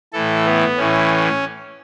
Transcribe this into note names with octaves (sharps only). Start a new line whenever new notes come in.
A2 E3 A4
B3
A2 E3 C#4